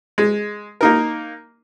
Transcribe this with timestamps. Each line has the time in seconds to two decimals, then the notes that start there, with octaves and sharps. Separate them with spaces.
0.18 G#3
0.81 A#3 D#4 A#4